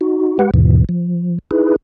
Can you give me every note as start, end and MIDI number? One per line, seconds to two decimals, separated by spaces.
0.01 0.38 63
0.01 0.38 66
0.39 0.51 56
0.39 0.51 67
0.39 0.51 71
0.39 0.51 78
0.54 0.84 39
0.54 0.84 44
0.54 0.84 47
0.54 0.84 52
0.89 1.39 53
1.51 1.76 63
1.51 1.76 64
1.51 1.76 68
1.51 1.76 71